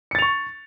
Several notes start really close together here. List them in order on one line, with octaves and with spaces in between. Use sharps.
C#7 A6 F7 C#6